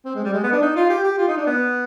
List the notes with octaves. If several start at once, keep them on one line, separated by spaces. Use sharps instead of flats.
C4
G#3
G3
G#3
B3
D4
D#4
F4
G4
G4
F4
D#4
D4
B3